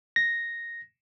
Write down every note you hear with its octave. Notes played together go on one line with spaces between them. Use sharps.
A#6